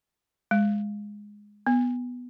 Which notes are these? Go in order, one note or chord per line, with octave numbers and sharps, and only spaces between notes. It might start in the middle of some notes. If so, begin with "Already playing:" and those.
G#3
B3